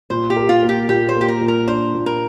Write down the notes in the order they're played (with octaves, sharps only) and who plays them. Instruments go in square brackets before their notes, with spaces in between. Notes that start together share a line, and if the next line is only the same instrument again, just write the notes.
[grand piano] A#2 [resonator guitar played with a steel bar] C5
[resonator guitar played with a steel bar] G4
[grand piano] A#4
[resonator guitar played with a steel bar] F4
[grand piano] A#3
[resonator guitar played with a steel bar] G4
[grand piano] A#2 [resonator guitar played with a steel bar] G4
[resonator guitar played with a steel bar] C5
[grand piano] A#3
[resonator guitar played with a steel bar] G4
A#4
[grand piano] A#2
[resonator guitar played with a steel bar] A#4
[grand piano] D4 [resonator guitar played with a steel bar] C5
[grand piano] A#2
[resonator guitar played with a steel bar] A#4